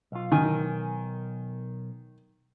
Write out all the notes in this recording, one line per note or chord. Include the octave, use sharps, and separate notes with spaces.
B1 F4
B1 D#3 A#4 G#5